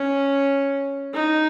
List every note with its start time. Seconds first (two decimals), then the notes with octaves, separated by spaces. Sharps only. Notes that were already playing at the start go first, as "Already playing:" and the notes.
Already playing: C#4
1.14 D#4